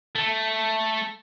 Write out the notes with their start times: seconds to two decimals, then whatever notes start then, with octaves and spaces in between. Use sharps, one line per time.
0.15 A3